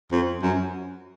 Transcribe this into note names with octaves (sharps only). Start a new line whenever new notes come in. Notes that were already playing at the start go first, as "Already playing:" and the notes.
F2
F#2